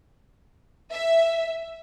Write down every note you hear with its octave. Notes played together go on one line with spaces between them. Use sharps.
E5